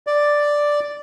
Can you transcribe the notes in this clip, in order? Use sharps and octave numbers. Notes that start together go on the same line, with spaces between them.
D5